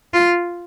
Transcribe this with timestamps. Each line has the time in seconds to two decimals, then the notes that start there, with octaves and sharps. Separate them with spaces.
0.13 F4